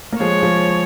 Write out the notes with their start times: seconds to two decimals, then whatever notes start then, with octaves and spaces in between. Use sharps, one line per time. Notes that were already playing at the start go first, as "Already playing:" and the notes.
0.13 A#3
0.20 F3 G#3 C#5
0.42 F3 G#3